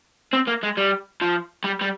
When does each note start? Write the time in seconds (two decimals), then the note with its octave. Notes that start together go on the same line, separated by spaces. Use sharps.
0.33 C4
0.48 A#3
0.63 G#3
0.78 G3
1.22 F3
1.64 G3
1.81 G3